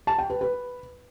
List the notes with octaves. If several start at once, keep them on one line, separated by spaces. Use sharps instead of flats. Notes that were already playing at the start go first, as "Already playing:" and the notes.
A5
G5
B4
B4